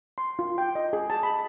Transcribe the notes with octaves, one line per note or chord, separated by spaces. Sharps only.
C6
F4
G5
D#5
G#4
A5
B5